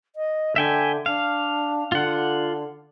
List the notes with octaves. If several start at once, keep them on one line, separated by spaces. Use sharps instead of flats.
D#5
D3 E5 G5 G#5
D4 F5
D3 F4 F#5